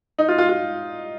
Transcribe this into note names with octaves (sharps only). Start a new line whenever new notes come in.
D#4
F4
F4
F4